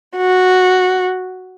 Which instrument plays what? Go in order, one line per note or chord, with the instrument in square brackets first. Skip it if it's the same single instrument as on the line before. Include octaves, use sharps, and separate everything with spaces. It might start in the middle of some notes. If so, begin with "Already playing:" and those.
[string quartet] F#4